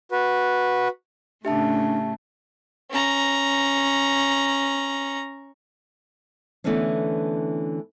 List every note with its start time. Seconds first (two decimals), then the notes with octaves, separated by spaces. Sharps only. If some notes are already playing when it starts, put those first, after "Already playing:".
0.11 F#4 B4
1.45 A2 C#3 A3 D4 G4 E5 A5
2.91 C#4 A#5
6.64 D3 E3 A3 B3 C#4 D4